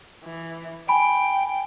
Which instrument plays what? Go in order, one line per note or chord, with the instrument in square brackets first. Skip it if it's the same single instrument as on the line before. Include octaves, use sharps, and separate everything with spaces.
[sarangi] E3
[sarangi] G5 [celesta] G#5 B5 D7